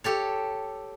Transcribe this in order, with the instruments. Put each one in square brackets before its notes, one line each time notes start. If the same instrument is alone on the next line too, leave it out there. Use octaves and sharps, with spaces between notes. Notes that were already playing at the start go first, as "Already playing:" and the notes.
[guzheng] G4 A4 C#5